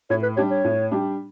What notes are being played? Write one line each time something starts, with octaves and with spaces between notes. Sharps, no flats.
A2 C#5
B4
G3 D4 G4 C#5
C#5
A2
G3 D4 G4